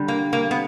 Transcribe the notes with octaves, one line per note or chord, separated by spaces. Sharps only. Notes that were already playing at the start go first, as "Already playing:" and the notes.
Already playing: D3 G3
A#3
A#3
B3